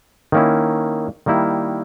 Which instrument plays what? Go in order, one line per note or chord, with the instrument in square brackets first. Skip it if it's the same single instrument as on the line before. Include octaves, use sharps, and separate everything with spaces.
[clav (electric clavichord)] D#3 A#3 C#4 E4
D#3 G3 A#3 E4